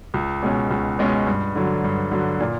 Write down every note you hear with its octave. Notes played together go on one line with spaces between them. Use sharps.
C#2
B2 G#3 C#4
C#2
B2 G#3 C#4
G2
D3 F#3
G2
D3 F#3
A#2